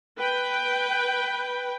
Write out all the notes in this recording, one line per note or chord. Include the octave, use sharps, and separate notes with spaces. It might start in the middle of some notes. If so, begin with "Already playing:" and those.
B4 G5